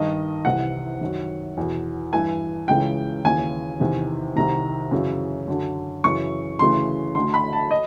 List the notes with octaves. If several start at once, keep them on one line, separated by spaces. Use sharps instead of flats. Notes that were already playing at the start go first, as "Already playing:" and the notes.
Already playing: G2 D#3 D#5
C2 C3 E3 F#5
F#2 D#3
E2 B2
G2 E3 G#5
C#2 C#3 E3 G5
D#2 C#3 E3 G#5
E2 C3 D#3
C2 C3 D#3 A#5
F#2 C#3 E3
F#2 D3
F#2 C#3 E3 C#6
D2 C#3 E3 C6
D2 D3 C6
B5
A5
D#5